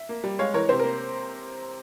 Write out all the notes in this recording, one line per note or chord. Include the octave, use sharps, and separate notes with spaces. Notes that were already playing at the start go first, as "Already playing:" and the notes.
Already playing: E5
A#3
G3
G#3 C#5 F5
E3 A#4 C#5
C3 C5
A#3 A#4